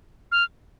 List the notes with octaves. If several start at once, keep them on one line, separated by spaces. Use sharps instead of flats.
F6